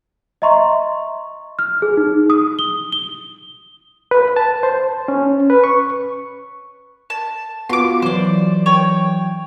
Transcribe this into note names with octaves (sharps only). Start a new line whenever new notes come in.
D#5 E5 A#5 C6 C#6
F6
G#4
D#4
D#6
G7
G7
B4
A5
C5
C#4
B4
C#6
A5
B3 F4 F#4 C6 D6
E3 F#3 C5 D5
C#5 G5